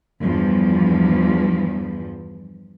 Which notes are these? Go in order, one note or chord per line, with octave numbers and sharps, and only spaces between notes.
E2 G2 F3